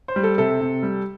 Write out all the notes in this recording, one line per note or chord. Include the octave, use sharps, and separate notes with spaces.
C5
G3
A4
C3 A4
C3
G3